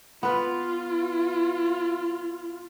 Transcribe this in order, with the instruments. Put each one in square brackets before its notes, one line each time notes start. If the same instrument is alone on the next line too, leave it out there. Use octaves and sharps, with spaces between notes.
[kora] B3 B4 [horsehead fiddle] F4